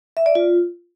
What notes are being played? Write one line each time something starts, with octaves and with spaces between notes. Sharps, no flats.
E5
D5
F4